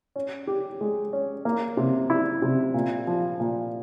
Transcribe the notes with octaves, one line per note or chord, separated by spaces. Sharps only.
C#4
G4
G#3
C#4
A#3
C3
E4
C3
A#2
F3
A#2